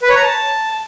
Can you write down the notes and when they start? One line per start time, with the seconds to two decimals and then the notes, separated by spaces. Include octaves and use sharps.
0.02 B4
0.09 C#5
0.16 A#5
0.23 A5